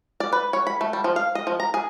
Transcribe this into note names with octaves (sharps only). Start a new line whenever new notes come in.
D5
B4
C#5
B5
A3
G3
F3
F5
D#5
F3
A#5
G#4